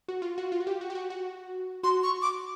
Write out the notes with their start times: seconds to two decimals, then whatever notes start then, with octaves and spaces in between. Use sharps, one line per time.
0.08 F#4
0.22 F4
0.38 F#4
0.52 F4
0.60 F#4
0.67 G4
0.81 F#4
0.90 G4
0.95 F#4
1.10 F#4
1.83 F#4 C6
2.03 C#6
2.22 D6